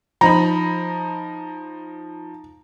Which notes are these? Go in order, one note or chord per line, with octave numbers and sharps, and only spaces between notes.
F3 D#4 A#5 B5